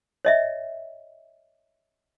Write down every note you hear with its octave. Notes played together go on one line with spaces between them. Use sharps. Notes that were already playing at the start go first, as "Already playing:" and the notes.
C#5 D#5 E5